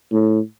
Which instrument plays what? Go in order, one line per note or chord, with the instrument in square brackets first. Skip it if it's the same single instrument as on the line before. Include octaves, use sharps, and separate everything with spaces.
[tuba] A2